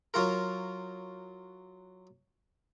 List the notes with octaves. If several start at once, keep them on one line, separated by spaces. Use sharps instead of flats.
F#3 F4 A#4